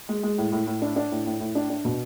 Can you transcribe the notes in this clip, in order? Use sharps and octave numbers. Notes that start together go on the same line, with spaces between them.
G#3
G#3
A2
A2
A2
D4
D4
A2
A2
A2
D4
D4
B2